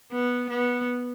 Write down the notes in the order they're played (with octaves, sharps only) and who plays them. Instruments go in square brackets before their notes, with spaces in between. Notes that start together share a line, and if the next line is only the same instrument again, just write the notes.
[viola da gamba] B3
B3